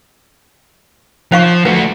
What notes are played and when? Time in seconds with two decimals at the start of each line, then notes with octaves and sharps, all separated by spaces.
1.32 F3 C5 F5 C#6
1.65 A3 F#4 B4